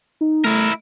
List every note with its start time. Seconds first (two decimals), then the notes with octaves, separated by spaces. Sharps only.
0.21 D#4
0.44 A3 E4 A#4